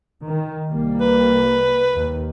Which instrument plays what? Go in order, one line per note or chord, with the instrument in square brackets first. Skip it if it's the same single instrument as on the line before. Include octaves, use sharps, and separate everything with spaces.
[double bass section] D#3
C2 G3 A#3
[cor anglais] B4
[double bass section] D#2